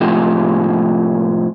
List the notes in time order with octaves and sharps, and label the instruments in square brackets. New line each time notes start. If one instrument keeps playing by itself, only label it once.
[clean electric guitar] A2 C3 F3 G#3